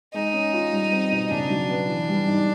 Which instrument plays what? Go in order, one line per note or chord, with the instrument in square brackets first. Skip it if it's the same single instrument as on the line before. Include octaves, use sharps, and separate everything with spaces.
[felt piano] G#3 [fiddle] D#4
[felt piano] C#4
F4
G3
C4
B2
[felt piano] C#3 [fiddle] D4
[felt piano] F#3
B3
E3
G3
G#2